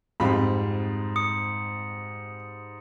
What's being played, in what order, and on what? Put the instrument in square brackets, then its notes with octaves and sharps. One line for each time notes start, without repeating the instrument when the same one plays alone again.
[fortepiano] F2 F5 B5 [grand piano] G#2 G3 C4
[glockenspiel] D#6 C#7